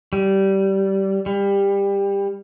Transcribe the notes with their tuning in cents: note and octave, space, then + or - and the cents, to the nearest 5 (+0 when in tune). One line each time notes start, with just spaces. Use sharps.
G3 -15
G3 +20